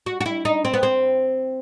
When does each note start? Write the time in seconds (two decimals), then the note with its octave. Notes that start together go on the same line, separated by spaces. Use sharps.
0.06 F#4
0.21 F#4
0.26 E4
0.45 D#4
0.65 C4
0.74 B3
0.83 C4